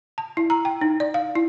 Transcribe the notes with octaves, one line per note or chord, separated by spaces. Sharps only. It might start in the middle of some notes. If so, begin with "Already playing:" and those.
A5
E4
A#5
G5
D#4
D5
F5
E4